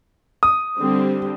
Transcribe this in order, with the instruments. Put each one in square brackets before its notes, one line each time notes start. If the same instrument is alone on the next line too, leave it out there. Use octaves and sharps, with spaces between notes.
[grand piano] D#6
[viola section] D3 G3 C4 G4